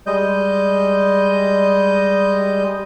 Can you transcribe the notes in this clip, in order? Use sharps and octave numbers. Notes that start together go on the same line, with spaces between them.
G3 G#3 D#5 G6